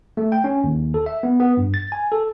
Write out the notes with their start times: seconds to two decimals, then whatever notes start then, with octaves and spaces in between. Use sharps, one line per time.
0.17 A3
0.32 G5
0.44 C#4
0.64 D#2
0.94 A4
1.06 E5
1.23 B3
1.40 B3
1.57 G2
1.74 A6
1.92 G#5
2.12 A4